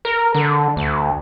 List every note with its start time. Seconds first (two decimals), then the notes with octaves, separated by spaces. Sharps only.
0.05 A#4
0.35 D3
0.77 D2